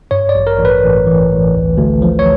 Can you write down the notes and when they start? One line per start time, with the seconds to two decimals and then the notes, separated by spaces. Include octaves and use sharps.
0.11 G2 C#5
0.29 D5
0.35 A1
0.47 A#4
0.59 A1
0.65 B4
0.83 A1
1.07 E3
1.31 A1
1.55 D2
1.78 D2
2.02 F3
2.19 C#5